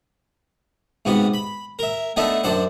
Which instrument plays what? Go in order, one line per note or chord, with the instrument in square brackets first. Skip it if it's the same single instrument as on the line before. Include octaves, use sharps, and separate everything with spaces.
[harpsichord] G#2 C3 B3 F#4
B5
A#4 E5
A3 B3 D4 D#4 D#5 E5
F#2 D4 C5 F#5